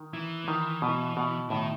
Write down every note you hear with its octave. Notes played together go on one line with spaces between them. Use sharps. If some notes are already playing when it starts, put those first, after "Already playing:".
Already playing: D#3
E3 E4
D#3
B2
B2
A2 D#3